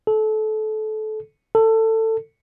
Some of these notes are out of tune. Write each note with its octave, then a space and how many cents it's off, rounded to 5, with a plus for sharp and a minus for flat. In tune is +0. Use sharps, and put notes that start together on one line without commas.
A4 -25
A4 +20